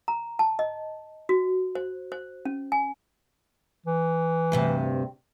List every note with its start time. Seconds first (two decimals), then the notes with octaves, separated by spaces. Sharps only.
0.08 A#5
0.39 A5
0.59 D#5
1.29 F#4
1.75 C5
2.12 C5
2.45 C#4
2.72 G#5
3.86 E3
4.52 D2 G2 C3